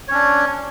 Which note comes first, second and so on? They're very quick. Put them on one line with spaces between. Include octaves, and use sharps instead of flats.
C#5 C#4 D4